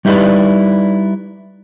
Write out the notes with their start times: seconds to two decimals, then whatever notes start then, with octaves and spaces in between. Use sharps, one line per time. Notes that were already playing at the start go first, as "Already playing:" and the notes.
0.05 G3 D#4 E4 G4 B4 D5